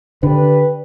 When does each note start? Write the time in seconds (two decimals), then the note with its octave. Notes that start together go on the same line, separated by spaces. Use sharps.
0.23 D3 D4 G4 B4